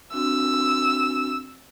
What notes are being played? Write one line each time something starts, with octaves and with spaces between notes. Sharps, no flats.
C4 D4 F#4 E6